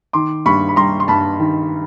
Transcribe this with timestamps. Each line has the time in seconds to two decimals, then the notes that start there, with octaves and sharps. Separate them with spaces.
0.13 D#3 C6 D6
0.46 G2 B5 C#6
0.69 B5
0.76 G3 A#5 C6
1.00 C6
1.08 G2 A5 B5
1.39 D#3